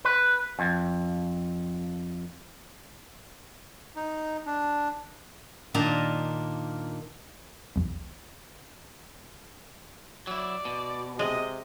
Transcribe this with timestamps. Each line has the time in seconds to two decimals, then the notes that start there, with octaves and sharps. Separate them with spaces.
0.05 B4
0.59 F2
3.96 D#4
4.46 D4
5.74 A#2 D#3 D4 D#5 A5 A#5
7.76 B1 E2
10.27 F#3 E4 D5
10.65 B2
11.19 C3 G#3 D#5